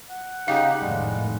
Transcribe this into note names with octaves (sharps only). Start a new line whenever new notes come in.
F#5
C#3 D#4 G4 F5
F1 A2 D#3 G3 G#3